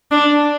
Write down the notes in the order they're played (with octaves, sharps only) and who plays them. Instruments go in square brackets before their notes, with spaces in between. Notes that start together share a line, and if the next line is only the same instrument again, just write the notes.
[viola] D4